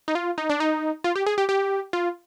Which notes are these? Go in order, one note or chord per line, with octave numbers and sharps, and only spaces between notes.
D#4
F4
D#4
D4
D#4
F4
G4
G#4
G4
G4
F4